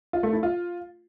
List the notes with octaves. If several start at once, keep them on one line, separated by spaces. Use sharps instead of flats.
F4
A3
E4
F4